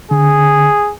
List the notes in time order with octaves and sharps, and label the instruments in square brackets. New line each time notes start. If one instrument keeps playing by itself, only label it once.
[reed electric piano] D3 [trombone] G#4